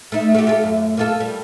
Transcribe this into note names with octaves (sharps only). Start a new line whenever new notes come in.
A3 D#4
A3 F#4 G4
F4 G4 A4
F#2
A#3 F4 A4
G3